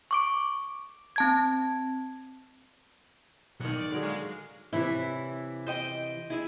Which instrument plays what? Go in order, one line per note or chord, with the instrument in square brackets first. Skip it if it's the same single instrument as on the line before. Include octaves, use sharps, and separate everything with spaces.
[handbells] C#6 D6 D7
C4 A5 G#6
[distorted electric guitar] B1 [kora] D#3 F#5
[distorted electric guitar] D5
[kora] D3 F#3 G#4
[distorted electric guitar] G#3 [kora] F#4 F5
[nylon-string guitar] C3 E3 C#5 [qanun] E4
[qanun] C5 D#5 G5
E4 G#4 E5